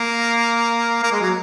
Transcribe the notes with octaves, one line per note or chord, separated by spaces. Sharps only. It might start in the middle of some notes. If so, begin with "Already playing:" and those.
Already playing: A#3
A#3
G#3
F#3